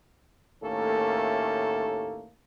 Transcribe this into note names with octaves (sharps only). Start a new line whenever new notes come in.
D#2 A2 A3 A#3 C#4 A4